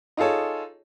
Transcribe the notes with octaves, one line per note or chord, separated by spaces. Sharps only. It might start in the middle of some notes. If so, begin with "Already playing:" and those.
D#4 F4 G#4 A4 C#5